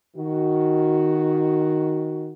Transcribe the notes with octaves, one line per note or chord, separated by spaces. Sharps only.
D#3 F#4